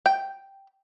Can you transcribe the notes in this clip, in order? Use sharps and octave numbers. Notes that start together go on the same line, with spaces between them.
G5